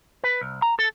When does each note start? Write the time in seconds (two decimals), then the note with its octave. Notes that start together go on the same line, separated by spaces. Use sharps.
0.24 B4
0.41 C2
0.62 A#5
0.79 A4